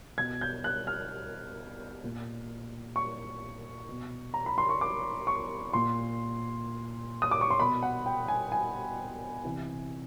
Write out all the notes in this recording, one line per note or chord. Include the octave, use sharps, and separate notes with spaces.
B2 G#6
G6
F#6
F6
A#2
C#6
B2
A#5
B5
C6
C#6
D6
C#6
A#2 C6
D#6
D6
C#6
C6
B2 B5
F#5
G5
G#5
G#5
C3 E3